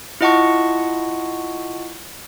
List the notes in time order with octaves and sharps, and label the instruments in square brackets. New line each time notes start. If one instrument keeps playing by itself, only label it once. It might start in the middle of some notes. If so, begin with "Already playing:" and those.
[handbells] E4 F4 D#5 F#5 A5 C#6